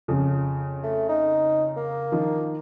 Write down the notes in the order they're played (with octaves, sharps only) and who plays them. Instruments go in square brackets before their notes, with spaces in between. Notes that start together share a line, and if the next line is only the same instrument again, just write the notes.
[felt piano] F2 C#3 F3
[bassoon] A3
D#4
A#3
[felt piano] D#3 F3